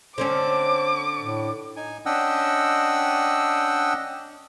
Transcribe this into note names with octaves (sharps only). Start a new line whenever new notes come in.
D3 C4 C#4 C5 D6
A2
D#4 G#5
C#4 D4 D#5 F#5 G5 E6